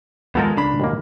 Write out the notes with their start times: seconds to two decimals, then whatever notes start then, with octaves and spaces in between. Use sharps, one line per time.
0.35 D#2 F3 G#3 B3 A4 A#4
0.57 C#2 D4 B5
0.80 D#2 B2 A#3